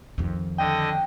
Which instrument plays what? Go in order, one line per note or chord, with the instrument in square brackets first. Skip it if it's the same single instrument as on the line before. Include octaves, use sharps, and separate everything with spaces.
[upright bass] F2 D#3
[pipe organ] D3 D#5 [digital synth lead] G5